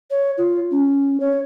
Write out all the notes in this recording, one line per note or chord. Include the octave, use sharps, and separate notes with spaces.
C#5
F4
C#4
C#5